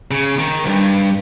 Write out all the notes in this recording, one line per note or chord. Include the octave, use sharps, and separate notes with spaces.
C#3
D#3
C2 G2